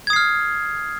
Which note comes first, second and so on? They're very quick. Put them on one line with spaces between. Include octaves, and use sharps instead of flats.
G#6 D#6 C7 F6